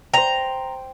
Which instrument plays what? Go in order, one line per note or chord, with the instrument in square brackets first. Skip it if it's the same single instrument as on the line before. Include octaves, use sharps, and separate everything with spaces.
[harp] C5 G5 [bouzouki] A#5